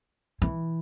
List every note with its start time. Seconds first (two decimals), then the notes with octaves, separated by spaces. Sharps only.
0.42 E3